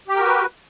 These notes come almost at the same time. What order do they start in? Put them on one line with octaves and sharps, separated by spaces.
G4 G5 A#4 F#4 B4